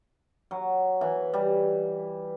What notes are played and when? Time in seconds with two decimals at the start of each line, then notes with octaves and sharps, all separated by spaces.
0.51 F#3
1.01 E3
1.34 G3